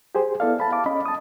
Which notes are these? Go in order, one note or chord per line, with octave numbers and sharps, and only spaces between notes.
G4 G#4 C5
B3 E4 A4 D5 F5
A5 B5
F5 A5 D6
C#4 D#5 B5
A5 D#6